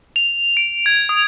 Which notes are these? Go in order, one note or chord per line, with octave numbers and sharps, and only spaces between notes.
F7
D7
G#6
D#6